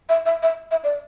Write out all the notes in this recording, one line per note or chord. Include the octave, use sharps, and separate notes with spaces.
E5
E5
E5
E5
D5